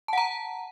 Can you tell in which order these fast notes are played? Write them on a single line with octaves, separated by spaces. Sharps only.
A5 F#5 A#5